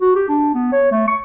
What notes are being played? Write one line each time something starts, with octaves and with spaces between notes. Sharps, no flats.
F#4
G4
D4
B3
C#5
A3
C#6